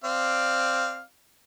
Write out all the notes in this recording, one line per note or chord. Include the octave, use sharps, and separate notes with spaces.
C4 D5 F5